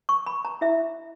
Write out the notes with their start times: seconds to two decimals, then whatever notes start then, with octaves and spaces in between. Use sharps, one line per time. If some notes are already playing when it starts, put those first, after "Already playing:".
0.09 C#6
0.26 B5
0.45 A#5
0.61 E4 E5